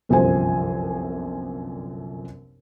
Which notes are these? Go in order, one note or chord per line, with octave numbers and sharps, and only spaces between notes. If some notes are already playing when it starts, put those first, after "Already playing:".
G1 C2 F#2 F3 C5 G#5